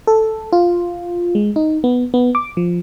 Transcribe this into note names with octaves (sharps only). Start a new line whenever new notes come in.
A4
F4
G#3
D#4
B3
B3
D6
F3